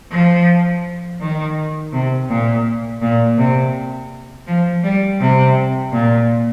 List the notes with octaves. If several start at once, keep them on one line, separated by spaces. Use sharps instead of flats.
F3
D#3
C3
A#2
A#2
C3
F3
G3
C3
A#2